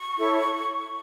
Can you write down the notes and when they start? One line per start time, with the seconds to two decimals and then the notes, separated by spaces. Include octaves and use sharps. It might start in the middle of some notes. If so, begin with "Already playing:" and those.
Already playing: C#6
0.16 E4 A4 C#5